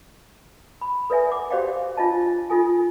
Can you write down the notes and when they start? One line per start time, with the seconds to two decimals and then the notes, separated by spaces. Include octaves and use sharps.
0.81 B5
1.10 A4 B4 D5 E5 G#5
1.30 F#5 D6
1.51 F#4 G4 C5 D5 F5 G5
1.97 D4 F4 D#5 A5
2.50 D#4 F4 A4 G#5